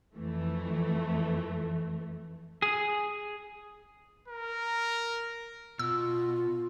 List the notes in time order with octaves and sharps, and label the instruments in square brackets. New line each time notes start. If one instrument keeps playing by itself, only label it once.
[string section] F2 E3 A3
[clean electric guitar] G#4
[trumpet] A#4
[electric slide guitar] B2 [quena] F4 [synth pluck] E6